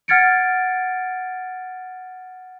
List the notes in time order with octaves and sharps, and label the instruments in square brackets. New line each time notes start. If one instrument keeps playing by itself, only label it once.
[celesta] F#5 F6 G#6 A6 C#7 D7